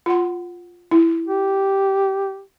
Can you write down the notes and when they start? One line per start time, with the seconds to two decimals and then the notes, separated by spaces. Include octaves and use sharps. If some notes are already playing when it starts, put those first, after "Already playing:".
0.06 F4 F#5 C6
0.91 E4
1.28 G4